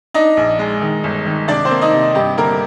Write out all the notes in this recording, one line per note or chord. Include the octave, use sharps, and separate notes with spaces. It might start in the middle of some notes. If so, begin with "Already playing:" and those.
D4 D#4 D#5
A#1
G#3
D#3
G1
D#3
C3 D4 D5
C4 C5
A#3
D#4 D#5
C3
G2 G4
D3 A#3 A#4